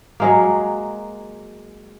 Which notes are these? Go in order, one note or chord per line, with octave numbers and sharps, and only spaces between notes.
F#3 G#3 A#3